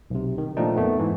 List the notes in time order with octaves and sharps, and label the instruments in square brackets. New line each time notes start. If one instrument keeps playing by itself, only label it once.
[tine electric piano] B1 C3
D#3
A#2 D#3 F3 A3 D4 D#4
F2 A3 B3
G#2 E3